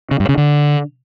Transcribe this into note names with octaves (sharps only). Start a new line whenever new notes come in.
C#3
G2
C#3
D3